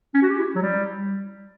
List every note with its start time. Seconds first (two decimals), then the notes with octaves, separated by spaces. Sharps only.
0.14 C#4
0.22 F#4
0.30 G4
0.39 E4
0.55 F#3
0.62 G3